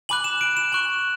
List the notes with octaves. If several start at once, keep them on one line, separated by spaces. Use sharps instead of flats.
G#5 B5 D6 F#6 F#7
E7
D7
E7
G#5 C#6 F#6 F#7